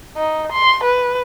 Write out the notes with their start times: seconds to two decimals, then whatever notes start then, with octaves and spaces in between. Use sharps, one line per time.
0.17 D#4
0.52 C6
0.83 B4